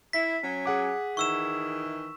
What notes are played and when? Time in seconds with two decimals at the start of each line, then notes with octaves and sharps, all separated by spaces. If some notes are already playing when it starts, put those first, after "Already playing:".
0.13 E4 B6
0.42 F#3 C#4
0.66 G#4 F#5 D6
1.17 D#3 E3 C#6 E6 E7